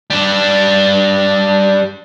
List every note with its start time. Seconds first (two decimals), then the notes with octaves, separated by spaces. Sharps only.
0.10 G3 D4